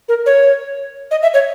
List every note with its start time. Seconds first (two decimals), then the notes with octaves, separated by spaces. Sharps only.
0.09 A#4
0.26 C#5
1.11 D#5
1.22 E5
1.34 C#5